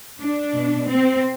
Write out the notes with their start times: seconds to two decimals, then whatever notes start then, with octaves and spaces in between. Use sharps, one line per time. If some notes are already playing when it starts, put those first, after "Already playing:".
0.20 D4
0.54 B2
0.89 C4